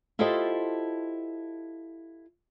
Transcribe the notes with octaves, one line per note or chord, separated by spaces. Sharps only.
E4 F4 G4 A4 C5 D#5